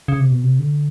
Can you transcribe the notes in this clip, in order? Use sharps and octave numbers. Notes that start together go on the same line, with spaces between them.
C#3
C3
B2
C3
D3